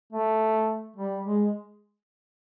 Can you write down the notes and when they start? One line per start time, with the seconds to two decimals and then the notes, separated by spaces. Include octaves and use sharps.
0.13 A3
0.97 G3
1.25 G#3